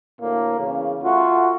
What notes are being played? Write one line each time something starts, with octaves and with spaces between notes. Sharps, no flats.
D2 A2 A#3
E2 C#3
A3 F4 F#4